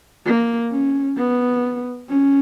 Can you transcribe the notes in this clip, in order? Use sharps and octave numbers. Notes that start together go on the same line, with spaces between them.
A#3
C#4
B3
C#4